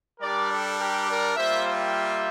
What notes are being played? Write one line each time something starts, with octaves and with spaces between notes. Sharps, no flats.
G3 D4 G4 A#4 D5
A4
G4 A#4
A#4 D5
G3 A#3 F4 C5 E5
E5 G5